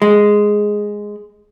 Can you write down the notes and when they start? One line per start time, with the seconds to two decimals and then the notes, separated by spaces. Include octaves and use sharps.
0.02 G#3